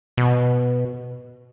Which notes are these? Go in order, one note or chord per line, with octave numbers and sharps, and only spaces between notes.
B2